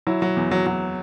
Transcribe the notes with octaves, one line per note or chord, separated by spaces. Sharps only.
F#3 E4
F#3
E2
F#3
F#3